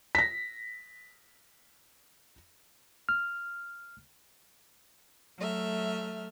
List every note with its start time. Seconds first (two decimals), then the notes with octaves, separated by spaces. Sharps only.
0.15 A#6 B6
3.09 F6
5.38 F#3 A3 E5 F6